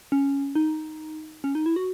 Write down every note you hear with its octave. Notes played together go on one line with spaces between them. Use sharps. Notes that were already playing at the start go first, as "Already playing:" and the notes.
C#4
D#4
C#4
D#4
E4
F#4